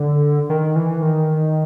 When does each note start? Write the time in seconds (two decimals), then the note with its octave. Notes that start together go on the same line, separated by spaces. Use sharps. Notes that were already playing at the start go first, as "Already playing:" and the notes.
Already playing: D3
0.49 D#3
0.76 E3
1.02 D#3